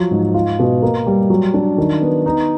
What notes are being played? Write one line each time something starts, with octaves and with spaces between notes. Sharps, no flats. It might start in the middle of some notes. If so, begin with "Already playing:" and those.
Already playing: F3 F#3
G#2
F4
B2
A#3
G3
F#3
D4
D#3
B3
D#4